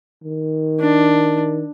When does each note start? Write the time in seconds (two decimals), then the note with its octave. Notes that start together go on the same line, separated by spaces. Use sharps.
0.24 D#3
0.80 D4